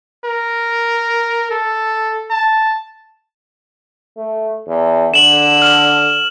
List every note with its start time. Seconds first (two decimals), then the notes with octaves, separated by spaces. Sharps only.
0.25 A#4
1.51 A4
2.30 A5
4.17 A3
4.68 E2
5.14 D3 E7 F#7
5.62 F6 E7